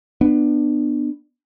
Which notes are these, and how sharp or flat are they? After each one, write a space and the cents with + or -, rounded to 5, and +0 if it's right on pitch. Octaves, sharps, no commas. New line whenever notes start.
B3 +0 D4 +25